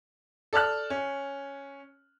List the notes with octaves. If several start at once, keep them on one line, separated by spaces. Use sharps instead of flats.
A4 D5 A5 F6 F#6
C#4